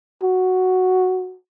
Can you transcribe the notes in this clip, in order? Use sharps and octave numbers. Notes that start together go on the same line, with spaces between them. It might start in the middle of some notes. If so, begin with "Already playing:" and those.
F#4